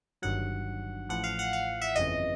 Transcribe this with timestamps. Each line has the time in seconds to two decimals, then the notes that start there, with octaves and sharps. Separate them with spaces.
0.22 G1 G2 D#3 F#3 F#5
1.09 A1 A2 F3 F#5
1.24 F5
1.39 F#5
1.53 F5
1.82 E5
1.96 G1 F2 C#3 E3 D#5